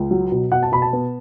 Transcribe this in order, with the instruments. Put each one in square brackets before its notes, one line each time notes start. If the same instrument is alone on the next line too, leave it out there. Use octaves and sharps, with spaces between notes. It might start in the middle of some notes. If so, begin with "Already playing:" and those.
Already playing: [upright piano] C#2
F#3
B2
B2 F#5
A5
B2 B5
A5
B3